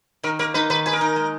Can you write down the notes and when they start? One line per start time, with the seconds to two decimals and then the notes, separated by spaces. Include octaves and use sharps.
0.23 D#3 A#4
0.39 A#3 A#4
0.54 D#4 B4
0.70 D#3 B4
0.86 G#4 B4
0.93 A#4
1.01 D#4
1.16 G#3